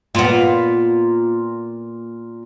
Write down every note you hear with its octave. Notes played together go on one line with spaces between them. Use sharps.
A#2 B3